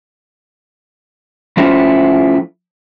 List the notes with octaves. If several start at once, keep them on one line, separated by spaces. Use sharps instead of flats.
F3 A3 C#4 E4 F4 C5